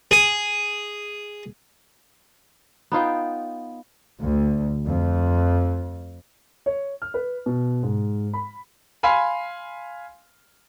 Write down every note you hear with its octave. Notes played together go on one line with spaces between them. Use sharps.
G#4
B3 D#4 F4 G5
D2
F2
C#5
F6
B4
B2
G#2
B5
F5 G#5 B5 C6